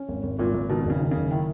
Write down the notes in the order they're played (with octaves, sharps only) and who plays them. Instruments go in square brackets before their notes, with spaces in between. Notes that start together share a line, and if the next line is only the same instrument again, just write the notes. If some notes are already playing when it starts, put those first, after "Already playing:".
Already playing: [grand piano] C#4
G#1
G#1
[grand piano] G#1 [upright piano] A#2
[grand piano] G#1
[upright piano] B2 [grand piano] D#3
[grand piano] F#1
[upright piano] C#3
[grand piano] D#3
[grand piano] F#1 [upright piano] C#3
[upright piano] D#3 [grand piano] E4